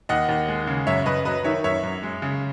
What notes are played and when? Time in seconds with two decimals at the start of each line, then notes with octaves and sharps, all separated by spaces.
0.09 D#2 D#5 F#5
0.29 D#2
0.48 G#3
0.67 C#3
0.87 F#2 C#5 E5
1.06 F#2 B4 D#5
1.25 F#3 B4 D#5
1.44 D#3 C#5 E5
1.64 F#2 C#5 E5
1.83 F#2
2.03 G#3
2.22 C#3